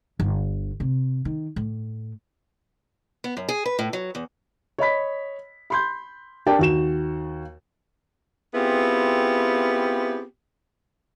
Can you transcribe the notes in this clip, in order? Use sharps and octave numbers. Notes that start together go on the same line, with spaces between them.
G1
C3
D#3
A2
B3
F#2
G#4
B4
A2
F#3
E2
C#5 D#5 B5 B6
B5 C6 G6
D4 G4 A#4 D5 G5 A5
D#2 F#4 E7
B3 C4 E4 F4 G4 G#4